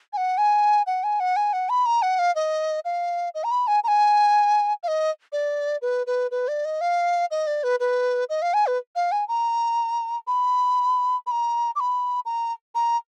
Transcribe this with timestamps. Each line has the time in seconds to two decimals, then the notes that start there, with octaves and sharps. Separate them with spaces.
0.13 G#5
0.17 F#5
0.38 G#5
0.86 F#5
1.03 G#5
1.20 F#5
1.36 G#5
1.53 F#5
1.69 B5
1.86 A#5
2.02 F#5
2.19 F5
2.35 D#5
2.85 F5
3.34 D#5
3.44 A#5
3.51 B5
3.67 G#5
3.84 A#5
3.88 G#5
4.83 F5
4.88 D#5
5.32 D5
5.82 B4
6.07 B4
6.31 B4
6.48 D5
6.65 D#5
6.81 F5
7.31 D#5
7.47 D5
7.63 B4
7.80 B4
8.29 D#5
8.42 F5
8.54 G#5
8.66 B4
8.95 F5
9.12 G#5
9.28 A#5
10.27 B5
11.26 B5
11.31 A#5
11.75 D6
11.80 B5
12.25 A#5
12.75 A#5